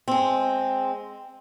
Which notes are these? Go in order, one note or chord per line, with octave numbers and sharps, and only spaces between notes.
G#3 C4